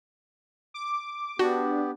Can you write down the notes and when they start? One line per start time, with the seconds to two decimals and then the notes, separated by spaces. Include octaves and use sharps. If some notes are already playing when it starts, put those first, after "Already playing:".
0.74 D6
1.39 B3 D4 F#4 G4